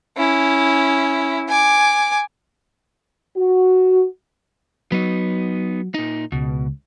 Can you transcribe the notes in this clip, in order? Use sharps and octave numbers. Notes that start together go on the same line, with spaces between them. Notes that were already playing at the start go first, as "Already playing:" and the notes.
C#4 E4
G#5 D6
F#4
F#3 B3 D#4
A#2 D#4
C#2 B2